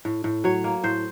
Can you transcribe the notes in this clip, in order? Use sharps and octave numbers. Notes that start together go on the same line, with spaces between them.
A2
A2
F#3 C#5
A#3
A2 C5